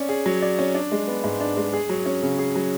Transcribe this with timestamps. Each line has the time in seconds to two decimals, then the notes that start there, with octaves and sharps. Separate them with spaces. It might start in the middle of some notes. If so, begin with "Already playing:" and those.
Already playing: C#4 D5
0.09 G#4
0.26 F#3
0.42 D5
0.59 C#4
0.75 D4
0.92 G#3
1.08 B3
1.24 G#2
1.40 D4
1.57 G#3
1.73 G#4
1.89 F#3
2.06 C#4
2.23 C#3
2.38 G#4
2.56 F#3